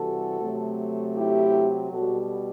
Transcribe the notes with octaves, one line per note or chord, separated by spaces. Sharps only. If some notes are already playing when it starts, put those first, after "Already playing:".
Already playing: C3 E3 G3 F#4 A4
C3 F#3 A3
E4 G4
B2 G3 F#4 A4